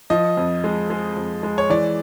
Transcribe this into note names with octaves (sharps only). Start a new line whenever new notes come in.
F3 D#5
F2
G#3
G#3
F2
G#3
C#5
E3 D5